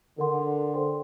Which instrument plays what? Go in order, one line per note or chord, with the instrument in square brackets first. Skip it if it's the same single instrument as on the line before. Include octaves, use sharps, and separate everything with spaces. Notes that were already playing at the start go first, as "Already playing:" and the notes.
[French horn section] D3 [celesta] A#4 F#5 C6
[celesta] A4 C5 G5 C6